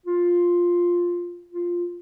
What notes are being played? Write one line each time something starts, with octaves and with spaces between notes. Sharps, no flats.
F4
F4